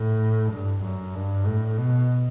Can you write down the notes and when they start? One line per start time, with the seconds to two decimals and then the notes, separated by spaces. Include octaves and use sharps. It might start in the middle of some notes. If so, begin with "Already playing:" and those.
Already playing: A2
0.52 G2
0.83 F#2
1.14 G2
1.46 A2
1.77 B2